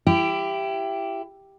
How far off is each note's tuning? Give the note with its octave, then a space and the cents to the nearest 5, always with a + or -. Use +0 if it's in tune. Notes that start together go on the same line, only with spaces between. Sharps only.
E4 +25 G4 +0